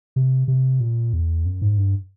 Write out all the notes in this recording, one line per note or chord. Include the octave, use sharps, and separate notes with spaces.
C3
C3
A#2
E2
F#2
G#2
G2